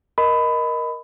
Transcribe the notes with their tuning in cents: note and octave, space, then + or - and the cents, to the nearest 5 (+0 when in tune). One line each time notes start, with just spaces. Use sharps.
A#4 +15 D#5 +0 B5 +20